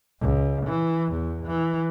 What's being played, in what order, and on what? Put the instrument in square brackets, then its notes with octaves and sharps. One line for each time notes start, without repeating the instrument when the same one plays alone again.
[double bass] C#2
E3
E2
E3